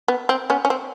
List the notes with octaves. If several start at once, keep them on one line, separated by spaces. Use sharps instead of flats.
B3
C4
B3 C#4
C#4
C4